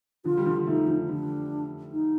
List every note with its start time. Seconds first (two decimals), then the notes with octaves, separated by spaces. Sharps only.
0.24 D3 F3 F4
0.37 G3
0.46 D3 F3
0.67 F3 A3 D#4
0.87 D3 F3
1.09 D3 F3 D4
1.92 D#4